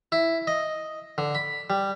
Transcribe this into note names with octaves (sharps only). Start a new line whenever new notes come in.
E4
D#5
D3
B5
G3